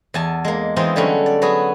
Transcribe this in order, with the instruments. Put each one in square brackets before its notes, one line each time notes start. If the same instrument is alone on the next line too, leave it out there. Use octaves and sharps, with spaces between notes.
[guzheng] E2 G#5 A5
G#3 A#3
E3 G#3 C4 D#4 F4
D3 F#3 G3 A3 C#4
D5
F#3 B3 F#4 G#4